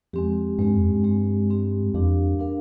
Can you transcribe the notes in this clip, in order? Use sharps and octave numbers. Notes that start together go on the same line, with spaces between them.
F2 G#3 C4 G4
G2 G#3 C4 G4
F2
G2
G#3 C4 G4
G#3 C4 G4
F2 D4 G4 A#4 F5
D4 G4 A#4 F5